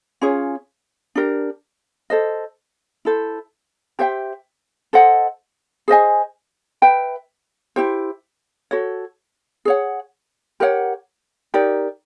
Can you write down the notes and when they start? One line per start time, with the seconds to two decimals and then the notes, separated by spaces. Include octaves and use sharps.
0.21 C#4 F4 G#4 C#5
1.15 D4 G4 A#4
2.10 A4 C5 D#5
3.05 E4 A4 C5
3.99 G4 C5 E5 G5
4.93 A4 C5 D#5 F#5
5.88 G#4 C5 D#5 G#5
6.82 B4 E5 G5
7.76 E4 G4 C5
8.71 F#4 A4 C#5
9.65 G#4 C#5 F#5
10.60 G4 A#4 C#5 F#5
11.54 D#4 G4 A#4 D5